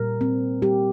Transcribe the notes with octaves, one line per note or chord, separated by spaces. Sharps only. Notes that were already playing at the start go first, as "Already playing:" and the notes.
Already playing: A#2 G3 A#4
C4
G3 G4